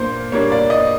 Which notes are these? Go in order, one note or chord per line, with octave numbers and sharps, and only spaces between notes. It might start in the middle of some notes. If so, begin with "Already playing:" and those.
Already playing: A#2 A#3 D4 C5
A#2 G3 A#3 D4 C#5
D5
D#5